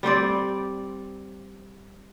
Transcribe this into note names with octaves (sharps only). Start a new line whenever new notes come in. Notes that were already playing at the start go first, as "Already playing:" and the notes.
G3 C4 C5 D5